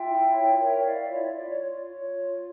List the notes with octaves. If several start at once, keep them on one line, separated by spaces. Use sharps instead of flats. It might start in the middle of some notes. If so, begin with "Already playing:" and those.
Already playing: F4 E5 G5
E4
C#5
A#4 C#5 E5
G5
E4 D5 F5
D5
F4 C#5 E5
D5
F4 D5
C#5
C#5
C#5
F4